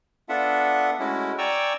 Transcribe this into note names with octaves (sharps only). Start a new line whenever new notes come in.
B3 D4 F4 A4 E5 F#5
G#3 A3 C#4 E4 F#4
D5 G5 G#5 A#5 C#6 E6